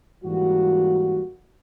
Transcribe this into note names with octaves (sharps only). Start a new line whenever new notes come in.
G#2 E3 G3 A#3 F#4